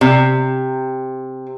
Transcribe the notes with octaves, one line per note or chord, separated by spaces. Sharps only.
C3